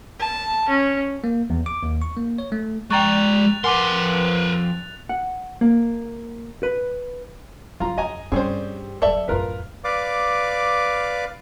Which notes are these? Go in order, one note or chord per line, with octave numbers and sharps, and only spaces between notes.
A5
C#4
A#3
E2
D6
D#2
C#6
A#3
C#5
A3
G#3 D5 G5 A#5 C#6 F#6 A6 F7
F2 A#4 B4 F#5 G#5 C6 D6
F#5
A#3
B4
F#3 E4 F4 A#5
F#2 D#5 G#5 A#5
G2 G3 C4 C#4 G#4 C5
F#1 F#3 A4 D5 E5
A1 F#2 F4 A#4 B4
B4 D5 F5 D6